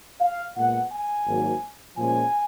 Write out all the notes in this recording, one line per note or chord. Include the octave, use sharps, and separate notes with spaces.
F5
A#2 G#3 B3 F#5
G#5
G#1 G#2 F#3 A#3
A#2 F3 G#3 C#4 G#5